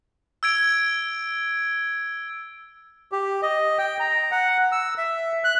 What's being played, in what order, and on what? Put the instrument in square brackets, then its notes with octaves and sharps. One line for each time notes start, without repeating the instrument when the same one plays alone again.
[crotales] E6 G#6 D7
[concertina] G4
D#5
G5
A#5
F#5
E6
E5
F#6